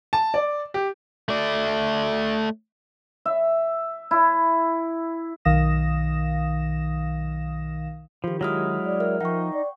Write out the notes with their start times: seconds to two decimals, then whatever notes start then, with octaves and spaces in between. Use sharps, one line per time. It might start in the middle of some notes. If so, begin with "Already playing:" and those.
0.13 A5
0.34 D5
0.74 G4
1.29 A3 D5
3.25 E5
4.11 E4
5.45 B1 D#3 F5 D#6 A#6 E7
8.24 D#3 F3 F4 G4
8.41 F#3 G#3 E4 D#6 F6 A#6
8.85 D5
9.00 A#4 E5 F6
9.21 F3 D#4 F#5 G5 C#6
9.54 D5